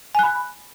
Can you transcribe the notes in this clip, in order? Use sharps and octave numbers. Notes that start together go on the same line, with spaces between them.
G#5 B5 F#6